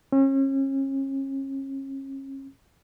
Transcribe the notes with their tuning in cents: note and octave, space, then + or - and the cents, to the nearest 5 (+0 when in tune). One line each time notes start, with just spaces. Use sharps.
C#4 -35